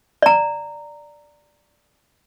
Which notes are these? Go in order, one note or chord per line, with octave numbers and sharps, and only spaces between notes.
D5 A#5